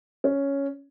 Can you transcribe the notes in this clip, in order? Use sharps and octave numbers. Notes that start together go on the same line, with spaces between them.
C#4